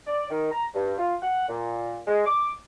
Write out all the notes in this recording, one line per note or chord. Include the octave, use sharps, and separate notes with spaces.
D5
D#3
A#5
G2
F4
F#5
A#2
G#3
D6